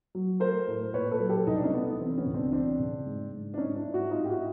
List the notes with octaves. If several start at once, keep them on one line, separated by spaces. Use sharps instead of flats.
F#3
A3 A#4 C5
A2
A#2 B4 C#5
A4 B4
F#3
G4 A4
C2 D#4
D4
C#4 D#4
A3 B3
E3 C4
B3 C#4
C#2
C4 D4
E3 C4 D4
C#3
G#2
G#2
D4
G#2 C#4 D#4
D4 E4
G#2
E4 F#4
A2 D#4 F4
G4
E4 F#4